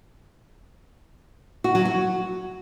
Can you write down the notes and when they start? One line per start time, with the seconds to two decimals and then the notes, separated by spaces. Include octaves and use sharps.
1.64 F#4
1.75 F#3
1.85 F#4